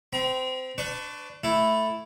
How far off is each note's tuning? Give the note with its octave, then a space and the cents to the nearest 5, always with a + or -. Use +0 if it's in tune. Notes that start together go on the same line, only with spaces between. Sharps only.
C4 -20 A#5 +40
D4 +0 B4 +40 C#6 +0
A3 +0 E4 +0